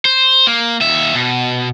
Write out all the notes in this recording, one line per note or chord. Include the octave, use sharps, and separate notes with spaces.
C5
A#3
D#2 E5
B2